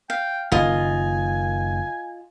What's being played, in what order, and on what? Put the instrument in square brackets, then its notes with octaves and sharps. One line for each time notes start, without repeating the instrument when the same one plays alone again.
[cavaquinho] F5 [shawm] G5
[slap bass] F#1 D#3 [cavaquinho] F4 D#5 [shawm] G#5